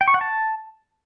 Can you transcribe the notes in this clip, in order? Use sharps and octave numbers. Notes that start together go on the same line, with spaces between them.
G5
C#6
F#5
A5